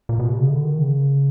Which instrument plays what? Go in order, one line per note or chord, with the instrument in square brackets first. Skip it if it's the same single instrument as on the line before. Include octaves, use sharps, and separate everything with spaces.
[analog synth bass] A#2
B2
C3
C#3
D3
D#3
C#3